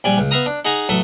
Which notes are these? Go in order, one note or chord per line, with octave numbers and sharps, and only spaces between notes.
A#1 G3 D5 G#5
C#2
B3 E5 F5 A#5 D#6
D4
D#4 G#4 F#5 G#5 A#5
A1 F#3 A4 E5 D#6